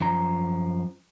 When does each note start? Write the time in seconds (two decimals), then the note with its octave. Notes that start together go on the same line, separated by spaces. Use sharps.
0.01 F#2 F3 A#5